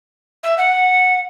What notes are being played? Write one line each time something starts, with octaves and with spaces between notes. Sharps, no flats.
E5
F#5